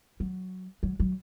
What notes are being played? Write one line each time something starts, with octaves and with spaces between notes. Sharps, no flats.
F#3
F#3
F#3